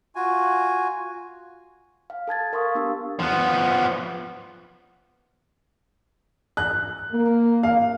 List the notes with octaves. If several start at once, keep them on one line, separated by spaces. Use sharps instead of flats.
F4 F#4 G#5
F5
A4 A5 G#6 A6
A#4 F5 C6 C#6 D#6
B3 D4 G4 E6
F3 B3
F#6
A#3
F5